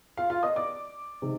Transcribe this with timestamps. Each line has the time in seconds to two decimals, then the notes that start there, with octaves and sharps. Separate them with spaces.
0.17 F4 F5
0.30 F4 F5
0.43 D#5 D#6
0.56 D5 D6
1.22 C3 D#3 G#3